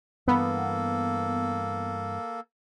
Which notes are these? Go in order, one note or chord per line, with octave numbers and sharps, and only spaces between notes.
G2 E3 A#3 B3 A4